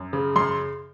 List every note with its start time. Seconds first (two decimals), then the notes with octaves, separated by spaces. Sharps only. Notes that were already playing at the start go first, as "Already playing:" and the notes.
Already playing: F#2
0.13 C#3
0.36 F#2 C6